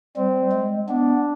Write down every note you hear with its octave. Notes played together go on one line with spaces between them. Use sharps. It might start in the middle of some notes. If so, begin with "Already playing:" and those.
G3 C4
G#3
B3 D4